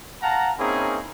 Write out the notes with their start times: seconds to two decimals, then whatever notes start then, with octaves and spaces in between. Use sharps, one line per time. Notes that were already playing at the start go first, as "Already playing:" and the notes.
0.22 F5 F#5 A5 A#5
0.58 A#3 C4 C#4 D#4 E4 G#4